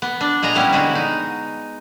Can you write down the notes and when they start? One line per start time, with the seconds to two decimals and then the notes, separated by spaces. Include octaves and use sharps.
0.02 B3
0.21 D4
0.43 A#2 G#3 D#5 A#5
0.55 G3 B3 C#4 E4
0.73 D3 G#3 F#4
0.95 D#4